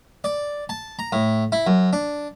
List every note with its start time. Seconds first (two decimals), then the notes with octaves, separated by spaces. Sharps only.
0.24 D5
0.69 A5
0.99 A#5
1.12 A2
1.52 E4
1.67 F#2
1.93 D4